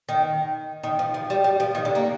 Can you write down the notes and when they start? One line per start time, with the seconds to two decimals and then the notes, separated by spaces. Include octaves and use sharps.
0.09 D#3
0.83 D#3
0.99 F3
1.14 F3
1.30 G3
1.44 G3
1.60 F3
1.75 D#3
1.85 D3
1.95 A#3